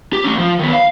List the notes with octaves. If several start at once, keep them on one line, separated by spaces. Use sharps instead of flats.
G4
A3 C#4
F3
D#3 B3
F5